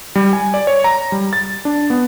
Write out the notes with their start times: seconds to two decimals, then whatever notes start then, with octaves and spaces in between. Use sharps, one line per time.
0.15 G3
0.33 G#5
0.54 D5
0.67 C#5
0.84 A#5
1.12 G3
1.33 A6
1.65 D4
1.90 B3